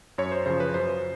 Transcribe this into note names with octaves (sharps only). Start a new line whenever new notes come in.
F#2 C#5
C5
C#3 F3 C5
B4
F#2 C5